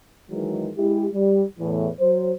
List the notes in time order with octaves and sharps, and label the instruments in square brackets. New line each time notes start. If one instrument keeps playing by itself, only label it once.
[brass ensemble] D#3 E3 F#3 G#3
G#3 E4 G4
G3
E2 A2 E3
F#3 C5